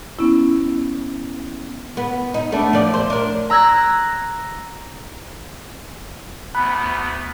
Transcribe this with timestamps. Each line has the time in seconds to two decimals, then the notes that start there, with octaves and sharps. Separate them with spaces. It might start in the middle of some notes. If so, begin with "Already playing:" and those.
0.19 B3 C#4 E4
1.97 B3
2.34 D#4
2.52 A3 B3 D4
2.73 F3 D5
2.94 C5
3.10 D4 A#4
3.50 A#5 E6 F#6 G#6 A#6
6.55 D2 B3 B5 F#6